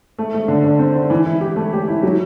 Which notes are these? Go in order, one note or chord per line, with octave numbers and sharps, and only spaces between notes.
A3
A3
D3
D3
C4
C4
E3
E4
G4
A3
G4
E4
F#3